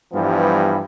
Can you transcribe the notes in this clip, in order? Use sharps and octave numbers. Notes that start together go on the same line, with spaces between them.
G2 E3 F3 G3 B3